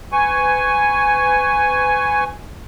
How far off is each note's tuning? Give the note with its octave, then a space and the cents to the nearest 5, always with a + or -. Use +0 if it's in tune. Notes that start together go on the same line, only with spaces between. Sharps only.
B4 +35 G#5 +0 C#6 +0